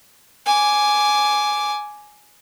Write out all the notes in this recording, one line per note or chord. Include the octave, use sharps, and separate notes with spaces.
G#5 D6